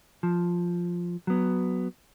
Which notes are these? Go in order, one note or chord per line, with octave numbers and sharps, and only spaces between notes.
F3
F#3 B3